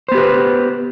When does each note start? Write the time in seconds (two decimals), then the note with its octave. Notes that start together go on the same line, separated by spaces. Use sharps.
0.09 C5
0.12 B3
0.15 G4
0.18 B4